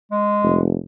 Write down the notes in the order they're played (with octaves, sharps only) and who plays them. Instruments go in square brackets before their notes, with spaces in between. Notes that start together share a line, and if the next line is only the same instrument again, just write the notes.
[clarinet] G#3
[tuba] F1